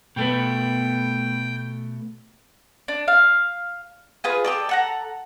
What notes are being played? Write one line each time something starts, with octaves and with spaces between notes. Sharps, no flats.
B2 A3 B3 G5
D4
F5
F4 G#4 B4
G4 A4 D5
A4 F#5 A#5